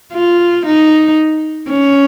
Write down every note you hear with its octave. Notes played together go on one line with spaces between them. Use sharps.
F4
D#4
C#4